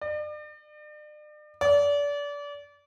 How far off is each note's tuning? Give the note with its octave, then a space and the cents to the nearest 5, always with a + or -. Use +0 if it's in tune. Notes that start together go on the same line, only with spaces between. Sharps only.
D5 +40
D5 -30